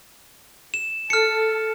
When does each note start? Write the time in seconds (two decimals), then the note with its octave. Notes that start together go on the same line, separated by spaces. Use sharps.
0.74 E7
1.10 A4 F6 C#7